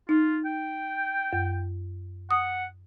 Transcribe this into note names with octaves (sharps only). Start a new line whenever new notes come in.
D#4 F4
G5
F#2
F#5 D#6